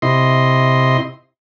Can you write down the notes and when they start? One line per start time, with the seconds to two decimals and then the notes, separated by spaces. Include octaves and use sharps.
0.02 C3 E4 D#5 C6